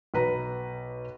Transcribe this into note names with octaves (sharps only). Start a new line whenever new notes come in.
B1 B4 A#5